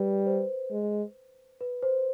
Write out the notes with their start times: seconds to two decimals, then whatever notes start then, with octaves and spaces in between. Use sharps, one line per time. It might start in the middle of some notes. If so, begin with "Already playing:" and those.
Already playing: G3 B4
0.26 C5
0.71 G#3
1.61 B4
1.83 C5